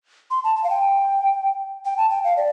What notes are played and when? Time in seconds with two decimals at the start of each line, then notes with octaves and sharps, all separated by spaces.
0.31 C6
0.44 A5
0.56 A5
0.64 F5
0.70 G5
1.85 G5
1.97 A5
2.10 G5
2.24 F5
2.37 D5